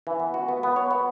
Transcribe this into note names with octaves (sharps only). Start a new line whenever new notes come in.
E3
B3
F#4
B3
B3
C#5
B3